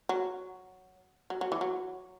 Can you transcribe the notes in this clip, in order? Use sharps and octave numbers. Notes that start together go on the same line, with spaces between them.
F#3
F#3
F#3
E3
F#3